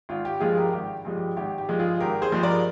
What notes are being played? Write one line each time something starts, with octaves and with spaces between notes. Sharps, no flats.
G#1 F4
G4
G2 F3 G#3 F4 G#4
G4 A#4
G#1 G4
G2 F3 G#3
G4
G#1 G4
G4
G2 F3 G#3
F4 G#4
G#1 G4 A#4
G#4 C5
G2 F3 G#3
A#4 D5